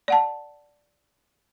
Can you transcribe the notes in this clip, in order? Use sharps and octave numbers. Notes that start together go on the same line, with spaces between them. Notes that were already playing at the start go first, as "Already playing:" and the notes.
D5 F#5 A5